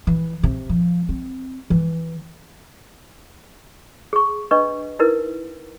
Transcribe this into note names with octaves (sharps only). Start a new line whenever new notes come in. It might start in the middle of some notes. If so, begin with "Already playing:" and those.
E3
C3
F3
C4
E3
G#4 C#6
D4 B4 D#5 C#6
D#4 E4 A#4 B4